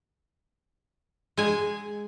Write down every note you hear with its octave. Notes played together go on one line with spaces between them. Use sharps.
G#3 G#5